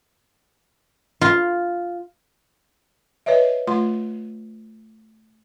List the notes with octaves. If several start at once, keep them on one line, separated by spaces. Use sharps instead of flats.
F4
B4 C#5 D#5 E5
A3 F4 C6